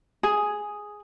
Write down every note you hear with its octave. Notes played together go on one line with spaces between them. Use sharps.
G#4